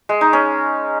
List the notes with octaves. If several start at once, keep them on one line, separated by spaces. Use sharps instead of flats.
G#3
D#4
C#4